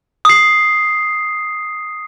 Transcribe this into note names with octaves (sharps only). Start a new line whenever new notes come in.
D#6 C7